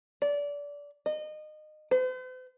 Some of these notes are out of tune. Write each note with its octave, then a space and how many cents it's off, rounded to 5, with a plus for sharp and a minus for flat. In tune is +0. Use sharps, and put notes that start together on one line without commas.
D5 -25
D#5 -25
C5 -45